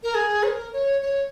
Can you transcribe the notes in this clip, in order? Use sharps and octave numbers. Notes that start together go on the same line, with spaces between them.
A#4
G#4
C#5
A#4
C#5
C#5